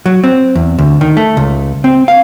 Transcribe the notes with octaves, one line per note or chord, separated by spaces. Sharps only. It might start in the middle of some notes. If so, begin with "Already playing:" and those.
F#3
C4
E2
D2
D#3
A3
C#2
C4
F5